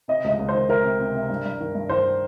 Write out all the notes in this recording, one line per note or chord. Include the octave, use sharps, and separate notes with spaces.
C3 D#5
C#2 D#5
C#2
C5
D#3
D#3 A#4
C3
C3
C3
G2
G2
D#3
G2
D#3 C5